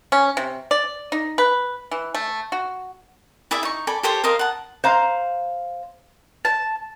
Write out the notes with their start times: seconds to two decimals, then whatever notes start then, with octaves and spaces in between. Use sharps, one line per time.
0.12 C#4
0.37 C3
0.71 D5
1.12 D#4
1.38 B4
1.91 E3
2.14 A3
2.52 F#4
3.51 E4 G#4 D5 E5
3.63 D#4 C#6
3.87 A4 D5 G#5 B5
4.03 G4 A4 C5 C#5
4.24 A#4 C5 D#5 F5
4.39 F#5 A5
4.84 C5 F5 A#5
6.45 A5